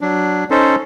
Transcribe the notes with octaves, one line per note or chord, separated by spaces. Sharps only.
F#3 D4
C#4 D#4 A4 C5